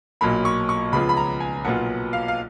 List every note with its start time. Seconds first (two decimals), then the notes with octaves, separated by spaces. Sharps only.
0.21 B1 A#2 F#3 A#3 B5
0.45 C#6
0.69 C#6
0.92 C#2 C#3 F3 B3 F4 B5
1.09 B5
1.17 A#5
1.40 G#5
1.64 B1 A#2 F#3 B3 F4 F#5
2.13 F5
2.28 F5